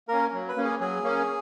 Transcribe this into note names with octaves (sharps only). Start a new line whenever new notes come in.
A#3 C#4 A#4
F#3
B4
A#3 C#4
G#4
F#3 G#4
A#3 C#4